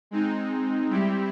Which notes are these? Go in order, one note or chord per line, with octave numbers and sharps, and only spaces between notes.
G#3 C4 D#4
G3 C4 E4 G4